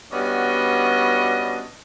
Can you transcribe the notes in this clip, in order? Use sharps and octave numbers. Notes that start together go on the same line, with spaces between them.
G3 B3 C#4 D4 F#4 D#5